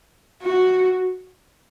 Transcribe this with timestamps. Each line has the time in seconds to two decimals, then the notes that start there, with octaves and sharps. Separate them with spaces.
0.43 F#4